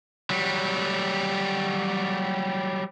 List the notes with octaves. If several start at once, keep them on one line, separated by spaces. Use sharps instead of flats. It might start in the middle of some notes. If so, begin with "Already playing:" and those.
F#3 G3